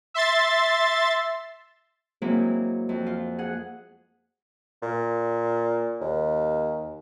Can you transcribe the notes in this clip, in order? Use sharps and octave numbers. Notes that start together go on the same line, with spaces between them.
E5 C6 A6
F#3 G#3 A#3 C4 E4
F2
F4
G#4 F#5
A#2
D#2